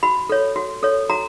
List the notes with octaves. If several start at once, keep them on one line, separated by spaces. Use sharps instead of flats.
F#4 B5
A4 C#5
F#4
A4 C#5
F#4 A#5